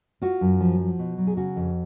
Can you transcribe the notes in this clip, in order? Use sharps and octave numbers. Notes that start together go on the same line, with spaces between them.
F4 F#4
F#2
F3
F3
B2
F#3
G#4
C#3 F#4
F2